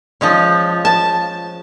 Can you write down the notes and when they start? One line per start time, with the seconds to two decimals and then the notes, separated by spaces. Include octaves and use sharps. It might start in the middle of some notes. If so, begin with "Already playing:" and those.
0.21 F3 G#3 C#4
0.85 A5